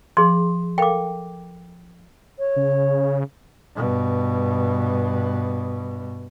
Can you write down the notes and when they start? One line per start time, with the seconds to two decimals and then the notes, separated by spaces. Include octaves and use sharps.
0.17 F3 G#4 C6
0.78 A4 A#4 F5 G5 D6
2.39 C#5
2.56 C#3
3.76 G2 B2